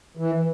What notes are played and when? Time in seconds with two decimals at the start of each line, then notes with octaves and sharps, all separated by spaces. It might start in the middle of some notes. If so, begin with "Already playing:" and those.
0.17 E3